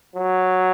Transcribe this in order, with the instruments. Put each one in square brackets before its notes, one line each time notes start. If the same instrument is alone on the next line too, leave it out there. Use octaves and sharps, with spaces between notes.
[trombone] F#3